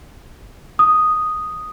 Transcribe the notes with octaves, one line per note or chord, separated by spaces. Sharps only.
D#6